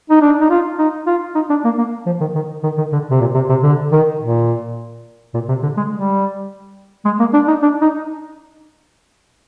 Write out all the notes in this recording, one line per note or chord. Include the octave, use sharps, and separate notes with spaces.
D#4
D4
D#4
F4
D#4
F4
D#4
D4
A#3
A#3
F3
D#3
D#3
D#3
D#3
D3
C3
A#2
C3
C3
D3
D#3
A#2
A#2
C3
D3
G#3
G3
G#3
A#3
D4
D#4
D4
D#4